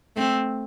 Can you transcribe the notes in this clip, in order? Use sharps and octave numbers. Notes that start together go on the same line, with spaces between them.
A3 C4